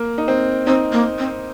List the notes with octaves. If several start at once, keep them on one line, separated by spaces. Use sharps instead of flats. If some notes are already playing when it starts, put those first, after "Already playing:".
Already playing: A#3
D#4
C4
C4 D#4
A#3
C4